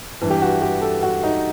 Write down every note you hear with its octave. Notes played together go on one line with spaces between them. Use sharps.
G2 E3
G4
F#4
G4
A4
F#4
D#4